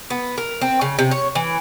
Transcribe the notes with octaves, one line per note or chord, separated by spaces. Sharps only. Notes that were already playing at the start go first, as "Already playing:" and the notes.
B3
A#4
C4
C#3
C3
C#5
E3